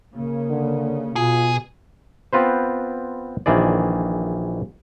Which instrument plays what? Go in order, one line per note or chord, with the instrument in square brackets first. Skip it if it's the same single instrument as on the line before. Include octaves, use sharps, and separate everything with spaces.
[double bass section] C#3 [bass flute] A#3
[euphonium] D3
[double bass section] B2 [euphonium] F4 [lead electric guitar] G#4
[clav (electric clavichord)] B3 C4 F4 B4 C5
A#1 D#3 E3 G#4 D5